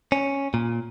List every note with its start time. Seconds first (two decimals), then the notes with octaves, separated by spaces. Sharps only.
0.12 C#4
0.54 A#2